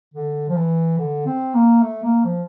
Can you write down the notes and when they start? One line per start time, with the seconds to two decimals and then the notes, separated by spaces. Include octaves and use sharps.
0.14 D3
0.49 F3
0.56 E3
0.98 D3
1.25 C4
1.54 A#3
1.82 A3
2.03 A#3
2.24 F3